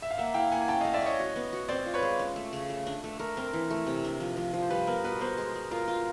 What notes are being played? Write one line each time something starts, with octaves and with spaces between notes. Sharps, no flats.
E5
F5
A#3 E5 F#5
E4 F5 G5
A#3 F#5 G#5
G#5
C#4 G5 A5
A3 D#5 F5
D5 E5
C#4 C#5 D#5
F#4
B3
F#4
C4 C5 D5
F4
B4 C#5
G#3
C#4
A3
C#3
A3
D4
A3
A3 A#4
C4 A#4
E3
A3
C3
D4
F3
F3
F3
C5
G3 B4
B3 A#4
B2 B4
B3 A#4 C5
G#3
G#3
F4 A#4
F4